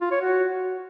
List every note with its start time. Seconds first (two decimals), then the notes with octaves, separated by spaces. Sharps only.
0.01 F4
0.11 C#5
0.22 F#4